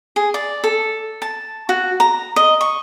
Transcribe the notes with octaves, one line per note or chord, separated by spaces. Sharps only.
G#4
D5
A4
A5
F#4
A#5
D#5
C#6